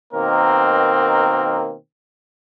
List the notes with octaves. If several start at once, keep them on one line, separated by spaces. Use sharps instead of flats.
B2 D#3 A#3 C4 A#4